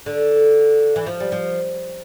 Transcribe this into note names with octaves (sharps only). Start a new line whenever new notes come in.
D3
E3
F3
G3
F3